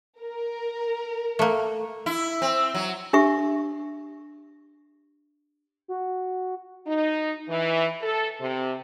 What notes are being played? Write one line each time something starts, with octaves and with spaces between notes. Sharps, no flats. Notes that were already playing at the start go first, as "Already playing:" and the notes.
A#4
A3 A#3
E4
C4
F#3
D4 G4 E5 C#6
F#4
D#4
E3
A4
C3